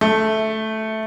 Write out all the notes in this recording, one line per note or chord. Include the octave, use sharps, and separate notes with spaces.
A3